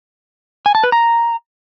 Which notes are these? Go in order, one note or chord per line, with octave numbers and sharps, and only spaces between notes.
G#5
A5
B4
A#5